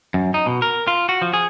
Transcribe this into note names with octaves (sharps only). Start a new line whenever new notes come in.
F#2
D#4
B2
A#4
F4
F#4
F3
G#4